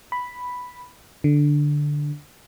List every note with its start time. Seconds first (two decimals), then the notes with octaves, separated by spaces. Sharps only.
0.12 B5
1.24 D3